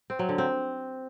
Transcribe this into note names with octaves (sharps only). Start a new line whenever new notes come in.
C4
F#3
D3
C4